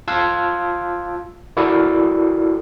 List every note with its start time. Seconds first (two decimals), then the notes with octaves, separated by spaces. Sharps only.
0.08 F4 F5 A5 E6 F#6 G#6
1.57 E4 F#4 A4 A#4 D5 E6